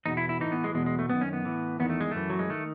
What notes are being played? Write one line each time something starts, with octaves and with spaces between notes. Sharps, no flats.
E2 B2 D#4
E4
E4
A2 E3 D#4
B3
G#3
E2 B2 G#3
G#3
A3
F#2 D#3 B3
C#4
B3
A2 E3
E2 D#3 B3
A3
G#3
F#2 E3 A3
F#3
G#3
D#3 A3